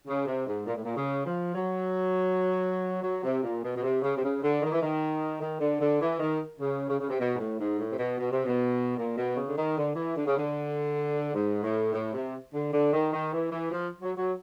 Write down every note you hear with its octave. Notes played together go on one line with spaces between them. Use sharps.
C#3
C3
G#2
A#2
A2
A#2
C#3
F3
F#3
F#3
C3
A#2
B2
B2
C3
C#3
C3
C#3
D3
D#3
E3
D#3
D#3
D3
D3
E3
D#3
C#3
C#3
C#3
C3
B2
G#2
A2
G#2
A2
C3
B2
B2
C3
B2
A#2
B2
C#3
D3
D#3
D3
E3
D3
C#3
D3
G#2
A2
A2
C3
D3
D3
D#3
D#3
E3
E3
F3
F#3
F#3